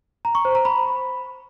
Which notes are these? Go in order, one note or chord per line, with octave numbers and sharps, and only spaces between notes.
A#5
C#6
C5
A#5
B5